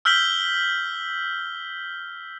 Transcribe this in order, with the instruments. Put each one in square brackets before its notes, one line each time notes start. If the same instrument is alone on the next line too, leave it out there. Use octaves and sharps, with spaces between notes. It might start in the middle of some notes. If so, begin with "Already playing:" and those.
[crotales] E6 F6 G6 B6 F#7 G7